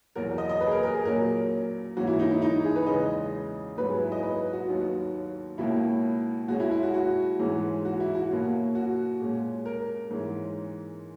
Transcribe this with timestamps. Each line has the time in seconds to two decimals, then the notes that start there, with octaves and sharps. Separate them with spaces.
0.15 E2 B2 F#3 A#4
0.38 D#5
0.49 D#5
0.61 B4
0.67 G#4
0.71 A#4
0.83 A#4
0.94 G#4
1.05 A#2 F#3 C#4 A#4
1.97 G#2 E3 A#3 C#4 F#4
2.07 E4
2.19 D#4
2.30 E4
2.42 D#4
2.64 G#4
2.76 B4
2.86 E2 C#3 G#3 C#4 D#5
3.77 G#2 F#3 B3 B4
3.89 G#4
4.00 E4
4.12 D#5
4.23 B4
4.53 F#4
4.68 D#2 D#3 F#3 B3
5.58 C#2 B2 A#3 C#4 E4
6.48 B2 G#3 C#4 F#4
6.60 E4
6.71 E4
6.83 F#4
6.93 F#4
7.39 G#2 E3 G#3 C#4
7.85 F#4
8.00 E4
8.15 F#4
8.30 B2 A#3 C#4
8.75 F#4
9.20 A#2 G#3 C#4
9.66 A#4
10.10 G#2 E3 G#3 C#4